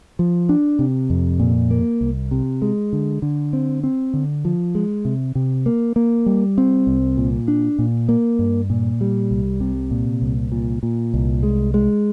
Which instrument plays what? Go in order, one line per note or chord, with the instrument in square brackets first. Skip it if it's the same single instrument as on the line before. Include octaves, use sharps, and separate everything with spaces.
[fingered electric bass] F3
D4
C3
F2
A#2
A#3
C2
C3
G#3
D3
D3
C4
C4
D3
F3
G#3
C3
C3
A#3
A#3
G3
C4
C2
A#2
D4
A#2
A#3
G2
A#2
G3
C2
C3
A#2
C2
A#2
A#2
C2
G#3
G#3